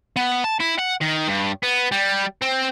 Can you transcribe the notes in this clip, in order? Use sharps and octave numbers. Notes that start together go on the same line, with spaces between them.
B3
A5
E4
F#5
D#3
G2
B3
G3
C4